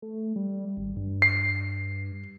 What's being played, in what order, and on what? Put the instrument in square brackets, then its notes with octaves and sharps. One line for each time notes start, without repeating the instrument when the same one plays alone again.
[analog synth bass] A3
G3
G#1
G2
[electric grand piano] C7